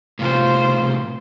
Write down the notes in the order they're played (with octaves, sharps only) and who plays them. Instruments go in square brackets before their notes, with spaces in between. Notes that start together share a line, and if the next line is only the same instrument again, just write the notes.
[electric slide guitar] A2 C3 [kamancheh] F4 C5